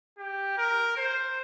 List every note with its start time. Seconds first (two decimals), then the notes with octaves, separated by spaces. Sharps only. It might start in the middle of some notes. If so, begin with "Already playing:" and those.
0.18 G4
0.58 A#4
0.97 C5